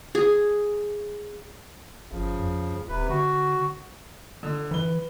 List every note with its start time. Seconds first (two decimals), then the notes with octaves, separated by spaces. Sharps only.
0.15 G#4
2.12 G1 C#3 F3
2.39 F2
2.89 D#1 C3 B4
3.09 D3 F#4
4.43 D3
4.71 E3 B4 G7